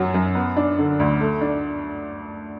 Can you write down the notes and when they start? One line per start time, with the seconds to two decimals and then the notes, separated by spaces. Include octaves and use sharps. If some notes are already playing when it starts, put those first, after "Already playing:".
Already playing: F#2 F#3
0.14 F#2
0.35 B3
0.57 D4
0.78 D3
0.99 D2
1.21 A3
1.41 D4